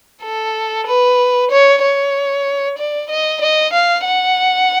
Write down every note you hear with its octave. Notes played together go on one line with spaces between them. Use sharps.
A4
B4
C#5
C#5
D5
D#5
D#5
F5
F#5